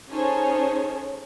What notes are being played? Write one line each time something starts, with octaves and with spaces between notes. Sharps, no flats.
C#4 D#4 G#4 A4 C5 C#5